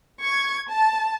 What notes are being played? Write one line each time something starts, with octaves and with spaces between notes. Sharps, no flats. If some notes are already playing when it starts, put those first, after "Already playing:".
C#6 G#6
A5